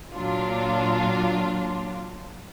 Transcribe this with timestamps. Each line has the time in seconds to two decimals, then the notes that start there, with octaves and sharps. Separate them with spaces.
0.14 A#2 F#3 D4 F4